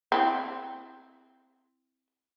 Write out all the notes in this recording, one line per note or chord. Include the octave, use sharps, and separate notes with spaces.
C4 E4